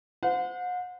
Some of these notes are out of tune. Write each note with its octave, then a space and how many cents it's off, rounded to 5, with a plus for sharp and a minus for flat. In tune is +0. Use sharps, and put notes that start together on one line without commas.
C5 -30 F#5 -40